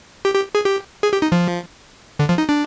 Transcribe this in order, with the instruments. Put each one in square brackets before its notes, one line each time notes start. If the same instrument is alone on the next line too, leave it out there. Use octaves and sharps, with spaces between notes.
[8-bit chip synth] G4
G4
G#4
G4
G#4
G4
D#4
F3
D3
F3
D#4
D4